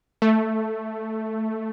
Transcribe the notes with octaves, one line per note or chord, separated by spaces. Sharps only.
A3